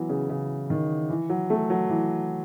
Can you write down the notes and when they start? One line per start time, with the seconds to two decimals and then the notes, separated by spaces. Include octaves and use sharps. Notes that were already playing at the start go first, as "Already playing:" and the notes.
Already playing: E3 F#3 B3
0.09 C#3
0.29 C#3
0.70 D#3
1.10 E3
1.30 F#3
1.50 A3
1.70 F#3
1.90 E3